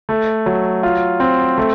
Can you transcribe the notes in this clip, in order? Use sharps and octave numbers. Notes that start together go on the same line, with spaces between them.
A3
F#3
F4
C4
A3